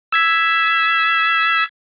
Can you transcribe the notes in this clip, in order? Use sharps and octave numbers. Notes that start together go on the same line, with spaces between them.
E6 G#6 B6